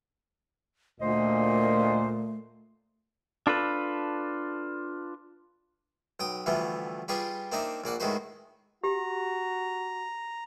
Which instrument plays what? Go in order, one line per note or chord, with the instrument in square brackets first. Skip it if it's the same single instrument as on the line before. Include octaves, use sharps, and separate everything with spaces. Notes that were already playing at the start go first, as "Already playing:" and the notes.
[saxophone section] D2 C5 D#5 [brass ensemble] A#2 [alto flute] A3
[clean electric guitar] D4 F4 A4 B4
[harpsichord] B1 G5 D#6
D2 E3 F3 G3 A3 B3
G3 F4 G4 G#4 B4 C#5
A#3 C4 D4 D#4 E5 F5
A#1 A#3 D5 F#5
A2 D#3 G#3 F#4 B4 C5
[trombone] F#4 [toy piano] G4 [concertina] A#5